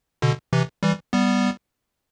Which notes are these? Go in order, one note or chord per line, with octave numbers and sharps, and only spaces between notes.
B2 D3
C3 E3
E3 G3
G3 B3